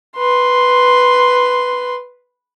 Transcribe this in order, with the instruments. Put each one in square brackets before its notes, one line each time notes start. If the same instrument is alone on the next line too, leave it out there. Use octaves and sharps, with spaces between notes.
[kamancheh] B4 C6